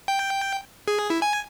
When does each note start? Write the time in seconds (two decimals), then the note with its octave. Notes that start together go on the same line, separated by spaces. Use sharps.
0.08 G5
0.88 G#4
1.10 E4
1.22 G#5